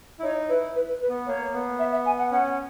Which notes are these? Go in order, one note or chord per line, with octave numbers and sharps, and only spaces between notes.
E4
D#4 C#5
E4 B4
B4
B4
B4
B3
A#3 C#5
B3
E5
E5
G#5
F#5
C#4 F#5